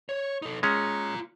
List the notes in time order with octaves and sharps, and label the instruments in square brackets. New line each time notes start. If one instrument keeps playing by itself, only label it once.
[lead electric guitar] C#5
D#4 A4
[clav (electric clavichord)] G#3 C#4 [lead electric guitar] F4 A#5